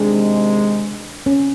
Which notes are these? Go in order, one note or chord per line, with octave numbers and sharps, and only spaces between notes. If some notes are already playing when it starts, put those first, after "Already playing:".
Already playing: C3 D#3 G#3 D4
C#4